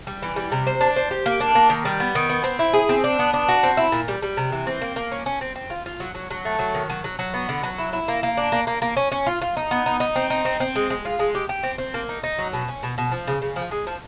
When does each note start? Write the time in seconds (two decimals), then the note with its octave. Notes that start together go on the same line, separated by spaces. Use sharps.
0.07 G3
0.22 E3
0.36 G3
0.52 C3
0.67 C5
0.81 D4
0.96 C5
1.11 G4
1.26 A#3
1.40 D4
1.55 A#3
1.70 D#3
1.85 G3
2.00 B3
2.15 D#3
2.29 B3
2.44 C4
2.59 E4
2.73 G#4
2.89 C4
3.04 D4
3.19 B3
3.34 D4
3.48 F#4
3.63 C4
3.77 E4
3.92 A#2
4.08 G3
4.22 G3
4.37 C3
4.52 E3
4.67 C4
4.81 A#3
4.96 A#3
5.12 C#4
5.26 C#4
5.41 C4
5.55 C4
5.70 F4
5.86 F4
6.00 F#3
6.15 F#3
6.31 F#3
6.45 A3
6.59 F#3
6.74 D#3
6.90 F#3
7.04 F#3
7.19 F#3
7.34 B3
7.49 D3
7.63 F#3
7.78 E4
7.93 E4
8.08 A#3
8.23 A#3
8.37 D4
8.52 A#3
8.67 A#3
8.82 A#3
8.97 C#4
9.11 C#4
9.27 F4
9.41 F4
9.57 D#4
9.71 B3
9.86 D#4
10.00 D#4
10.15 C4
10.30 D#4
10.45 C4
10.60 C4
10.75 G#3
10.90 G#3
11.05 F4
11.19 G#3
11.35 G4
11.49 G4
11.63 C4
11.78 C4
11.94 A#3
12.09 D#4
12.23 D#4
12.38 F#3
12.53 B2
12.68 C#4
12.83 B2
12.98 B2
13.12 F3
13.27 C#3
13.42 C#3
13.56 F3
13.71 G#3
13.87 F3